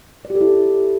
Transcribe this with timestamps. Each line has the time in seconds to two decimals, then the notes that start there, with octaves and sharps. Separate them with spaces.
0.25 D5
0.30 G4
0.35 A4
0.41 E4